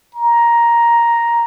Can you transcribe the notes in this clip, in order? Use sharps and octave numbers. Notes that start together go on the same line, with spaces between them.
A#5